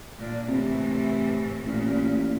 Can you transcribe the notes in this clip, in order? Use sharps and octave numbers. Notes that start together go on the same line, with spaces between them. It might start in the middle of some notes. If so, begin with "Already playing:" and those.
A#2 D4
A2 C3 E3
A1 A#2